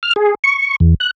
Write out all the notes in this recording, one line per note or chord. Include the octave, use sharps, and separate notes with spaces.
F6
G#4
C#6
E2
F#6